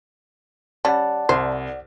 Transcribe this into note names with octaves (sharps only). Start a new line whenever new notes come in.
G3 C#4 D5 F#5 A5
C2 C5